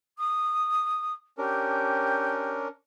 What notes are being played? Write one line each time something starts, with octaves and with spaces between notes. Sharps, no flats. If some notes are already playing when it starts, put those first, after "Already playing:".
D#6
C#4 D4 G4 A#4